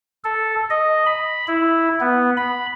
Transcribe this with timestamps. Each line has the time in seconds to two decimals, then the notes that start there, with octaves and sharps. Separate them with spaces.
0.24 A4
0.70 D#5
1.06 B5
1.48 E4
2.00 B3
2.37 B5